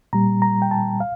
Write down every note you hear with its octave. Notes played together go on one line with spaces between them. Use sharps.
A#2 G3 A#5
A#5
G5
A5
F5